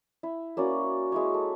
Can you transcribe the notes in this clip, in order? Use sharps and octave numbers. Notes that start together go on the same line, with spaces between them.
E4
A#3 C#4 F#4 D5
G#3 E4 C#5
A4